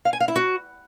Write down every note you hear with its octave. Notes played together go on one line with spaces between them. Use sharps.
F5
G#5
F5
E4
F#4